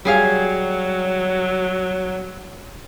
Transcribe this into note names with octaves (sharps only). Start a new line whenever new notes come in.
F#3 G3 G#4 F5